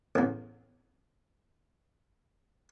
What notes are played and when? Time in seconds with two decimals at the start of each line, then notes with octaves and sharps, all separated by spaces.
0.15 A1 E2